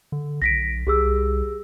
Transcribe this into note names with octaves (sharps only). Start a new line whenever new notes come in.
D3
B1 A#6 B6 D7
C2 G4 G#4 E6